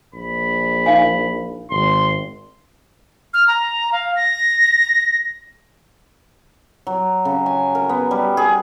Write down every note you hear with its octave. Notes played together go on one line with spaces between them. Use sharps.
A#1 B5
D#4 F5 G#5
G#1 C6
F6
A#5
F5
A#6
F#3
C#3
G#5
A#4
B3
G3
G#4